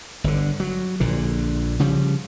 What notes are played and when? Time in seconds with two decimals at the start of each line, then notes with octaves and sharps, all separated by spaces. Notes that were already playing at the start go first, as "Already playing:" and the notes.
0.24 G1 D3
0.60 F#3
1.00 A#1 A#2 D3
1.79 C#3 F3 G3